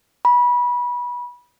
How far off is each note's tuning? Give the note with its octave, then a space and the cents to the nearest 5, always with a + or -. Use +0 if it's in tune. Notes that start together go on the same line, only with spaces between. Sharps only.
B5 -25